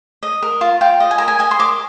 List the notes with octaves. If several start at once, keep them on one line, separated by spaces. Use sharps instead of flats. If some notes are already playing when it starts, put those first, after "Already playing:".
D#5
A#4
F4
F4 G5
D#5
G#5
A#4 A#5
G#5
D#5 G#5
C6
A#4 D6